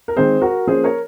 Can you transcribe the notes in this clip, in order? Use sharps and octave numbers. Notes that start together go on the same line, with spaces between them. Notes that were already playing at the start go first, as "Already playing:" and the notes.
A#4
D#3 G#3 C4 G#4 C5
F#4 A#4
F3 A#3 C#4 G#4 C5
A#4 C#5